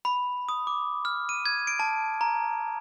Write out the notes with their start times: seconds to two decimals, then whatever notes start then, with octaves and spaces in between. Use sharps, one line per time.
0.05 B5
0.49 D#6
0.67 D6
1.05 F6
1.29 D#7
1.46 G#6
1.67 D7
1.79 A5
2.21 A#5